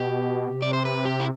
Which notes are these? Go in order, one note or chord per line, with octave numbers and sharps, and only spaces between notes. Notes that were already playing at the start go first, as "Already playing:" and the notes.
Already playing: B2 G4
C3
D5
C5
B4
G4
E4